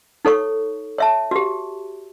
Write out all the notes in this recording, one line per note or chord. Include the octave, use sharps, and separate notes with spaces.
D#4 A4 C#5 C#6
C#5 E5 A5
F#4 G4